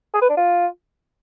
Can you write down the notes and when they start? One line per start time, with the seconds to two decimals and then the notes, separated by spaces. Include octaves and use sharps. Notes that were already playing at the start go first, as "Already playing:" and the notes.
0.14 G#4
0.22 B4
0.30 D4
0.37 F4